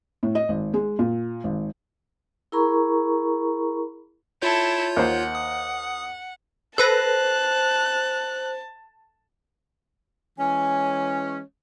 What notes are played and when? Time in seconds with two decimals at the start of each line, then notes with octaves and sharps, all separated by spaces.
0.23 A2
0.35 D#5
0.49 G#1
0.74 G#3
0.99 A#2
1.44 G#1
2.52 E4 G#4 A#4 A#5 B5 C#6
4.42 E4 F4 A4 C#5 G6
4.96 D#2 C5 F#5
5.35 D#6
6.78 A4 B4 C5 A5 F#6 A#6
10.39 E3 G#3 C#4 G#5